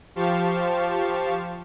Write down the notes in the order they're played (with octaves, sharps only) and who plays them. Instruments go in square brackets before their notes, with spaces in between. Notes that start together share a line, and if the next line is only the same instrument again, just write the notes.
[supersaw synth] F3 G4 C5 F5 A5 C#6